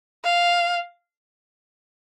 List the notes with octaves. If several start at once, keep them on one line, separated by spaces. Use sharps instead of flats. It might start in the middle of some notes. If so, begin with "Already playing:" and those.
F5